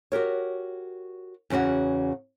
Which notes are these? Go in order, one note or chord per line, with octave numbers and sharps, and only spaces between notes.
F#4 G4 A#4 C#5
E2 C#3 C#4 F#4 F#5